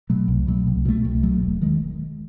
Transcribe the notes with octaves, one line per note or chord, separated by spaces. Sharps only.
B2 F#3 A3
C2
B2 F#3 A3
C2
B2 F#3 A3
C2
B2 F#3 A3
E1
D#3 G#3